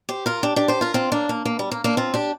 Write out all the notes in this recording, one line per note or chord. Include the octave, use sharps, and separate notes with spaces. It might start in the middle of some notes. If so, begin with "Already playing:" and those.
G4 C5
F4 A#4
D4 G4
D4 G4
G4 C5
F4 A#4
C4 F4
A#3 D4
A#3
A#3
G3
A#3
A#3 D4
C4 F4
D4 G4